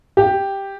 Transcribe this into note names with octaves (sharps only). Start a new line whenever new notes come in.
G4